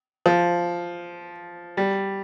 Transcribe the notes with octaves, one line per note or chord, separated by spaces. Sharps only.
F3
G3